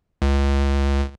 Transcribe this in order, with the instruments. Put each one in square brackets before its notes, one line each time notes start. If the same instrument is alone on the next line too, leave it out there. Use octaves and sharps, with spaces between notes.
[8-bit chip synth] C#2